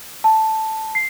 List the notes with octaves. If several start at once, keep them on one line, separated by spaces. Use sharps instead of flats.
A5
C7